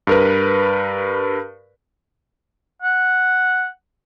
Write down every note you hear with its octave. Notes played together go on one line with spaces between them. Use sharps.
G2 A#4 B4
F#5